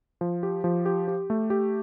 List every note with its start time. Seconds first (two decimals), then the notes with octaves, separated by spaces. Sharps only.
0.21 F3
0.43 G4
0.64 F3
0.86 G4
1.08 G4
1.30 A3
1.50 G4